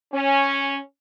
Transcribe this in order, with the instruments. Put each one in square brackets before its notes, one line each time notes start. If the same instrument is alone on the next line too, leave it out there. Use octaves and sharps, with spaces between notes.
[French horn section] C#4